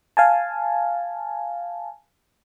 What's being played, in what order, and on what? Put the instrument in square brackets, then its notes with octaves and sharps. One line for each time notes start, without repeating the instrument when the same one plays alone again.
[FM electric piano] F5 G#5 A5